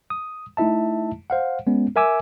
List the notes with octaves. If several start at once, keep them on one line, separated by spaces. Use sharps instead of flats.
D#6
A3 D#4 E4 E5 A5
C5 F5 F#5
G#3 B3 C#4
A#4 E5 G#5 D6 E6